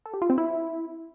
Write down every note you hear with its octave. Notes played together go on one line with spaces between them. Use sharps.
A4
G4
F4
C4
E4